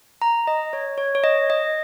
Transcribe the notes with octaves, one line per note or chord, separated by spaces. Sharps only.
A#5
D#5
C#5
C#5
C#5
D#5
D#5